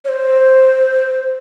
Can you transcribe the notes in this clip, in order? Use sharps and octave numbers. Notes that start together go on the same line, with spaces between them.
C#5
C5